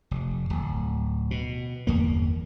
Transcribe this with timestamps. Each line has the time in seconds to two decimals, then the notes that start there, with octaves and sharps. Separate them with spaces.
0.11 F1
0.50 D1
1.31 B2
1.87 G1 E2 A#3